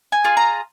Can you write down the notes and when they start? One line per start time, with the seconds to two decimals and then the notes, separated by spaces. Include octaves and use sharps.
0.12 G#5
0.24 F4 G#4
0.37 A#5